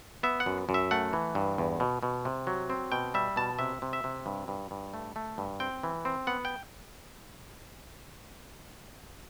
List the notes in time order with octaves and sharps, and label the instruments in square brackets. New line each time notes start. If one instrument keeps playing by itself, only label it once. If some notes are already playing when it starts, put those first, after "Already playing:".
[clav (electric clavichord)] B3 E5
F#5
F#2
F#2
E5
A3 F#5
E3
G2
E2
B2
B2
C3
F#3
C4
B2 G5
G3 E5
B2 A5
C3 E5
C3
E5
C3
G2
G2
G2
A3
A3
G2
C4 G5
E3
C4
B3 F#5
G5